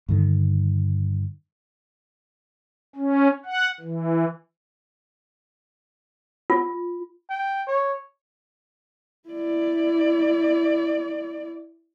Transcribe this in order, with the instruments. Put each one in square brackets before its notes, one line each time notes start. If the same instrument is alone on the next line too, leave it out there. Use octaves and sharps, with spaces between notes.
[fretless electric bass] G2 D3 D#3
[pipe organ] C#4
F#5
E3
[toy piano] F4
[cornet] G5
C#5
[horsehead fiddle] E4 D5